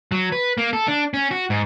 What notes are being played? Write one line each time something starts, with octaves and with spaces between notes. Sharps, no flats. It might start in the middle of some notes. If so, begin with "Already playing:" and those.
F#3
B4
A#3
A4
D4
C#4
F#4
G#2